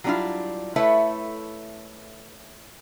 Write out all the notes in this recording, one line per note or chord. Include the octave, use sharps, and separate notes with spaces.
F#3 G3 C#4 D4 E4 F4
A3 E4 A4 B4 C#5 E5